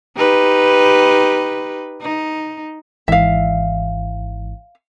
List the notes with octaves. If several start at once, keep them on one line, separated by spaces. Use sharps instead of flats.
D#4 G4 B4
D#4
G#1 G#2 E3 E5 F5